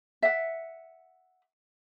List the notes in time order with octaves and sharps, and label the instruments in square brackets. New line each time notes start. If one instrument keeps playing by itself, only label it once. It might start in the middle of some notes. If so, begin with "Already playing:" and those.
[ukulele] E5 F#5